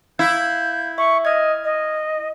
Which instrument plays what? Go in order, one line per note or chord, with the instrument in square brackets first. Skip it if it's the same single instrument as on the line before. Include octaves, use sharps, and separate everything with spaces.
[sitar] E4 [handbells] F5 [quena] G6
[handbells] E5 [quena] C#6
[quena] D#5 [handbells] F6 G#6
[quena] D#5